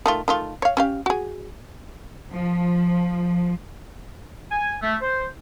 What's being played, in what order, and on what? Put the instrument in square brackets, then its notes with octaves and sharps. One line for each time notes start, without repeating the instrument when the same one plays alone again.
[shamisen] D#3 A3 F4
D#3 A3 F4
C#5 F5
C#4 G4 F5
F#4 G#4
[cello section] F3
[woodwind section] G#5
A3
C5